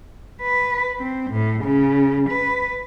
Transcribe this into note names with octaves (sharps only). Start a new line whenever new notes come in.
B4
C4
A2
C#3
B4